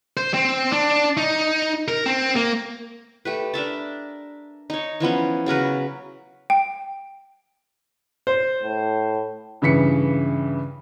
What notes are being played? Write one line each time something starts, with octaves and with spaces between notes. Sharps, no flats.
C5
C4
D4
D#4
A#4
C4
A#3
A3 G4 B4
D4 A#4 E5 A5
D#4 C#5
E3 F3 B3 C#4
C#3 F#3 A#4 B4
G5
C5
A2
G2 C#3 E3 B6 C#7